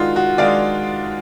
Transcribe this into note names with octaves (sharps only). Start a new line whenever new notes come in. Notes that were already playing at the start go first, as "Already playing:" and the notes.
Already playing: D#3 G#3 D4 F4 F#4
F#4
D#3 G#3 D4 D5 F5